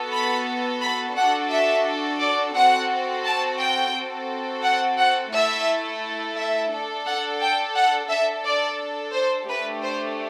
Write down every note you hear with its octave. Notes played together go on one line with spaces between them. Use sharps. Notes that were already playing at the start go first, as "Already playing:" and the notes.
Already playing: B3 F#4 A4
B5
B5
D4 F#4 A4 F#5
E5
D5
C4 F#4 A4 F#5
A5
G5
C4 F#4 A4
F#5
F#5
A3 E4 A4 E5
E5
D4 A4
F#5
G5
F#5
D4 A4 E5
D5
C5
A3 D4 G4 B4
C5